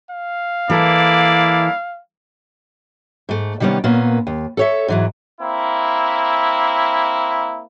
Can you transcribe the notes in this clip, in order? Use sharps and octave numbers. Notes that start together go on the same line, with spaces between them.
F5
E3 A#3 E4 A4 D5
G#2 A3
C3 D#3 G3 B3 C#4
A#2 A#3 B3 C#4
D#2
A4 C#5 E5
G#2 E3 F#3
A#3 C4 E4